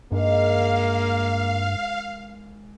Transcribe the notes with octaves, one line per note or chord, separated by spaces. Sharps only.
G2 D#3 G#3 A#3 F5